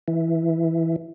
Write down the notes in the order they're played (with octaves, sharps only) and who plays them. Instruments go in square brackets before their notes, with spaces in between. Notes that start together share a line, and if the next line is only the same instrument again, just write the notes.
[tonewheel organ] E3